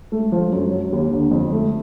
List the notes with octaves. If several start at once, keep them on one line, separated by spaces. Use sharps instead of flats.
A3
F3
F#2
F#3
D#2
D3
F2
A3